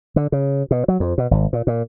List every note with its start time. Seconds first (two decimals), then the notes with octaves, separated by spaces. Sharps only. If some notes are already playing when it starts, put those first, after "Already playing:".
0.16 D3
0.32 C#3
0.71 B2
0.88 F#3
1.00 F2
1.18 B2
1.31 G#1
1.53 A#2
1.67 A#2